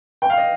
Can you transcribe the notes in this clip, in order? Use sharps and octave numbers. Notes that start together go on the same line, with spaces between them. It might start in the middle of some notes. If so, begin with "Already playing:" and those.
G5
F5
D#5